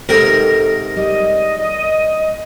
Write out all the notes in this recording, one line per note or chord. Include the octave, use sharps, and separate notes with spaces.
G#2 C3 A4 A#4 G5
G3 D#5